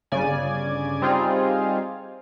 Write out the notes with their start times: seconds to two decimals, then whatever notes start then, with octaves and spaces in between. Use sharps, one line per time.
0.12 G1 C#3 D5 G#5
1.02 G3 C4 D#4 F4 G#4